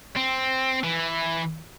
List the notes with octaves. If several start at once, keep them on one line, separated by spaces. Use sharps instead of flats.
C4
E3